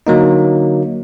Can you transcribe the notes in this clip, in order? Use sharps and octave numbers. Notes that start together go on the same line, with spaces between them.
D3 F#3 A#3 D#4